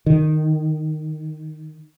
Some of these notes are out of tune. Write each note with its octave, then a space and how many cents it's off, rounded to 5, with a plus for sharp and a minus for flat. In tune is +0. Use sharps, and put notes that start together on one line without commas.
D#3 -10